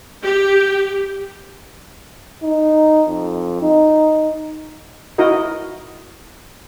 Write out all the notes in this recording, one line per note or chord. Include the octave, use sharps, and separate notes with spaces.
G4
D#4
F2
D#4
D#4 E4 F#4 A#4 D#5